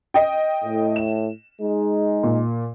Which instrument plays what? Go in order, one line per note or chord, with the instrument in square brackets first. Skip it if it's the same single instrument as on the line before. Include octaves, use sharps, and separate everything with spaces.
[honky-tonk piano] D#5 G5
[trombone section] A2
[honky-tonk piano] E7
[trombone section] G#3 D#4
[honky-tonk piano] A#2